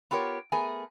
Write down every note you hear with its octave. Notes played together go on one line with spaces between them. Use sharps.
B3 F4 G4 A#4 C#5
A3 B3 G#4 A#4 G#5